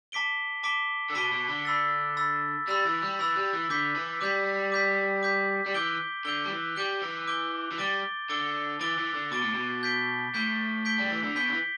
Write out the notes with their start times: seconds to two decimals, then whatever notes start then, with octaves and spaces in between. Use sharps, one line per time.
0.12 A5 D6 B6 D7 G7
0.63 A5 D6 B6 D7 G7
1.10 D3
1.15 B2 A5 D6 B6 D7 G7
1.32 B2
1.48 D3
1.65 B5 E6 A6
2.17 B5 E6 A6
2.68 G3 B5 E6 A6
2.85 E3
3.02 G3
3.19 E3 B5 E6 A6
3.36 G3
3.53 E3
3.70 D3 D6 G6 B6
3.96 E3
4.21 G3 D6 G6 B6
4.72 D6 G6 B6
5.23 D6 G6 B6
5.66 G3
5.74 E3 D6 G6 D7 G7
6.25 D3 D6 G6 D7 G7
6.45 G3
6.50 E3
6.76 G3 D6 G6 D7 G7
7.02 E3
7.28 D6 G6 D7 G7
7.71 E3
7.78 G3 D6 A6 D7 G7
8.29 D3 D6 A6 D7 G7
8.81 E3 D6 A6 D7 G7
8.98 E3
9.15 D3
9.32 B2 D6 A6 D7 G7
9.43 A2
9.55 B2
9.83 G6 B6 D7 G7
10.34 A2 G6 B6 D7 G7
10.85 G6 B6 D7 G7
10.98 G3
11.10 E3
11.23 D3
11.36 B2 G6 B6 D7 G7
11.49 D3
11.53 E3